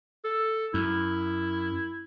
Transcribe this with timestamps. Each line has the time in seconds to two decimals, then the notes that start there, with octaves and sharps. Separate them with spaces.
0.24 A4
0.74 F#2 E4